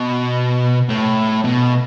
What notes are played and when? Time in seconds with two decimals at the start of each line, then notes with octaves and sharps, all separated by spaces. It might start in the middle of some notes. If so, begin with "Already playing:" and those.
Already playing: B2
0.89 A2
1.45 B2